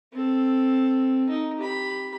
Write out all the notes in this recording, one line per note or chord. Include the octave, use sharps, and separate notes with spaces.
C4 A4
D#4
G4 B5